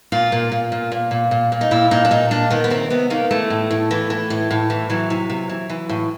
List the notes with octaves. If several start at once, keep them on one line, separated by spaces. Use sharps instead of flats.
A#2 F4
A#2
A#2
A#2
A#2
A#2
A#2
A#2
D#4
A#2 E4
A#2 D#4
D4
A#2 D#4
A#2 D4
D#3 B3
B3
C3 C4
C3 B3
D#3 A#3
E3 A3
A2
A2
E3
E3
A2
A2
E3
E3 F#3
C3
C3
E3
E3
A2